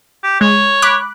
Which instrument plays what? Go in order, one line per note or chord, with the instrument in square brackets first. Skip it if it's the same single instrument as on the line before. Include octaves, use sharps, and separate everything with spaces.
[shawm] G4
[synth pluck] G#3 [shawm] C#5
[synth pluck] B5 D6 F#6